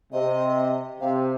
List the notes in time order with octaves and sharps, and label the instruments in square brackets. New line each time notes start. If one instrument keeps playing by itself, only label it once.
[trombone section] C3 [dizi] D#5
[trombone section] C3 [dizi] F5